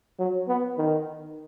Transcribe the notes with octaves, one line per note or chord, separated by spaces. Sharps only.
F#3
B3
D#3